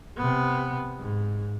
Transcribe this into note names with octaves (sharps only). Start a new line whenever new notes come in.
C3 B3
G#2